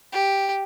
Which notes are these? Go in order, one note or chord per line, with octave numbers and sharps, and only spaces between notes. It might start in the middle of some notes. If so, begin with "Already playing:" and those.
G4